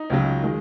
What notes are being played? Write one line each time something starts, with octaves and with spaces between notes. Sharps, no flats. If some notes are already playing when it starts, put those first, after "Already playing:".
Already playing: D#4
C#2 C#3 F#3
D#3 G#3